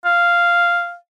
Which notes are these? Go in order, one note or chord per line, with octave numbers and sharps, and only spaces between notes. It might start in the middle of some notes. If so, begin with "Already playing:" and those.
F5